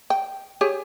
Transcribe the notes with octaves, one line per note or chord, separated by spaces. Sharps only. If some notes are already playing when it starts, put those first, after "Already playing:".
G5
G4 G#4 C#5